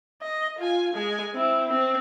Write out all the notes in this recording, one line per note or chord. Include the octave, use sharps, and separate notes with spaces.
D#5
F4 G#5
G#3 G#5
C4 E4
C4